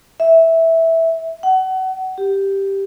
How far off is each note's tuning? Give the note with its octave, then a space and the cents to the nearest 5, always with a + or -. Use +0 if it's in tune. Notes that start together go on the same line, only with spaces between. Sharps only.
E5 -10
F#5 +30
G4 +0